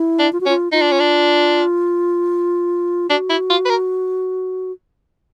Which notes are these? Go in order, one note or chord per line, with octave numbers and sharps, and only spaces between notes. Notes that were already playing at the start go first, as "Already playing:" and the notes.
Already playing: E4
D4
F4
F#4
C#4
F4
D#4 F4
D4
C#4
D4
D4 F#4
E4
F4
B4
A#4